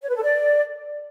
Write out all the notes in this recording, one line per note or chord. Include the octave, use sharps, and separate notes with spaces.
C#5
B4
A4
D5